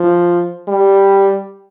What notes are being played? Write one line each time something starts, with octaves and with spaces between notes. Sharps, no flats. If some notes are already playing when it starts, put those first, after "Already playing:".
Already playing: F3
G3